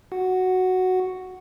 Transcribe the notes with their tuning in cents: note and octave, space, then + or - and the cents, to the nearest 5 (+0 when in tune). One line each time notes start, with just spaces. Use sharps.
F#4 +0 F#5 +0